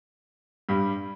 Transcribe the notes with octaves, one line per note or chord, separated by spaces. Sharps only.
G2 G3